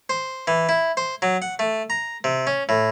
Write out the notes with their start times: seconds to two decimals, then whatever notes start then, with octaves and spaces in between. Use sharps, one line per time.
0.09 C5
0.47 E3
0.69 E4
0.97 C5
1.22 F#3
1.42 F#5
1.59 A3
1.90 A#5
2.24 C3
2.47 C#4
2.69 A2